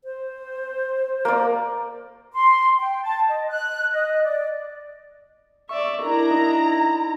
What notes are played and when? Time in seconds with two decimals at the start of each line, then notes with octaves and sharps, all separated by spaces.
0.04 C5
1.25 A#3 D5
2.33 C6
2.79 G5
3.02 A5
3.29 D#5
3.48 F#6
3.92 D#5
4.23 D5
5.69 D5 E5 C#6
6.02 D4 E4 A#4 A#5
6.31 D#4